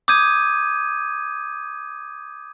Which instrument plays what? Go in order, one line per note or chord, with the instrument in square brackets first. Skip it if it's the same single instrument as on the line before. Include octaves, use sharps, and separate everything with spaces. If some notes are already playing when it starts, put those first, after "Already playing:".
[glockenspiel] D6 D#6 G6 G#6 D#7